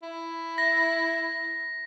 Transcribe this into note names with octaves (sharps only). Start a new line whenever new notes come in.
E4
A#6